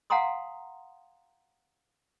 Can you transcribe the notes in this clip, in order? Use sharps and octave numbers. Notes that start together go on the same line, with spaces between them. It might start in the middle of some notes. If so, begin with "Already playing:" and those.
F5 F#5 G#5 A#5 C6 D#6